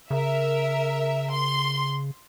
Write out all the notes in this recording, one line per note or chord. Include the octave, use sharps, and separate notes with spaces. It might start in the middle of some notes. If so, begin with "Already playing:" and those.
C#3 A#4 E5
C6